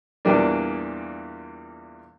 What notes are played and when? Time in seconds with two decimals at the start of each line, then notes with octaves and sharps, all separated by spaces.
0.25 E2 A#2 E3 G3 A#3 D4